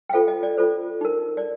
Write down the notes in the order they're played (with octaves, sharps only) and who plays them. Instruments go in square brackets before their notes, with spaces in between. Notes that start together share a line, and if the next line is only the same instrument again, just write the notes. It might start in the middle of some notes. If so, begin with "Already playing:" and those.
[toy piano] G5
F4 A4 C5 F5
D#5
D5
F4 A4 C5
D#4 A#4
D5